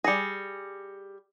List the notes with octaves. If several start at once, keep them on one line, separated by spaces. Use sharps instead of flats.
G3 G#4 A#6 C#7